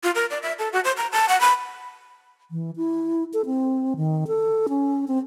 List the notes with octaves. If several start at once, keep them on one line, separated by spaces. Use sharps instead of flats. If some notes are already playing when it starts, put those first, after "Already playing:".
F4
A#4
D5
E5
A4
F#4
C5
A#5
A5
F#5
B5
E3
E4
A4
C4
D#3
A4
C#4
C4